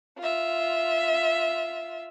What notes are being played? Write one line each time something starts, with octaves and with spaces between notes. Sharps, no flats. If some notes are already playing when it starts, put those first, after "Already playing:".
F4 E5